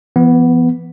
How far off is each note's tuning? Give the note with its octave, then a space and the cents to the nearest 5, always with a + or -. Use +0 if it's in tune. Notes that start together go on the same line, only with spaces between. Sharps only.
E3 +45 B3 +0